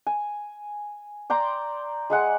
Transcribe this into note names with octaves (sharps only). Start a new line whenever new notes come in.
G#5
D5 G5 A#5 C6
G#3 G#4 F#5 G#5